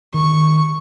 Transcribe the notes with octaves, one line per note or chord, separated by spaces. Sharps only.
D#3 C#6